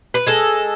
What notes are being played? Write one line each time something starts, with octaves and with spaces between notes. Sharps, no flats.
B4
G#3 A4